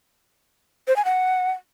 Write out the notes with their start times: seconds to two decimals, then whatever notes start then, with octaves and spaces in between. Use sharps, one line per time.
0.88 C5
0.96 G#5
1.05 F#5